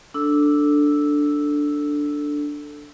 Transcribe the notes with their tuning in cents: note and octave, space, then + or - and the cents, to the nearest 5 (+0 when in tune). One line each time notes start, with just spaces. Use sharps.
D4 +0 A4 +5 E6 +0